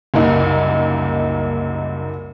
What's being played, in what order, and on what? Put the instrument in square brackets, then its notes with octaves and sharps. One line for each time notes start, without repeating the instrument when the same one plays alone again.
[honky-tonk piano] F#1 C2 A#3 D#4